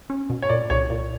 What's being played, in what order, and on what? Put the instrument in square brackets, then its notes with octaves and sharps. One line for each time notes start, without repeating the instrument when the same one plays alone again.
[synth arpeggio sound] C#4
B2
[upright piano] C#5
[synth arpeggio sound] A#2 [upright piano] D5
[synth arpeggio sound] C2 [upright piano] C#5
[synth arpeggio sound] A#2